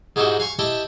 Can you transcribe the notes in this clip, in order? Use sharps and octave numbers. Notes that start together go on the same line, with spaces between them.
G#2 G#3 D#4 E4 F#4 G4
F5 G#5 C#6
E4 G4 D#5 G5 A5